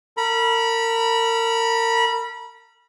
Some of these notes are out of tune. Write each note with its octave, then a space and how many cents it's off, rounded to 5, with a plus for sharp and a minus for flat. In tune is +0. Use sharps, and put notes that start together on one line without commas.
A#4 -35 B5 -25